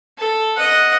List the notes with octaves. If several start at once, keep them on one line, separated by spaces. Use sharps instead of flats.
A4
D#5 F#5